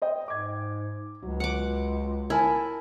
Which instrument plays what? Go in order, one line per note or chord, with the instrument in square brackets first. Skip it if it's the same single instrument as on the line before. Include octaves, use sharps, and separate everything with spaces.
[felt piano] C5 D#5 G5
[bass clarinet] G#2 [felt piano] D6 G#6
[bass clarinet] C#2 [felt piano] F#3
[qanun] F#5 D6
[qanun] E4 [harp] A#4 G#5 A5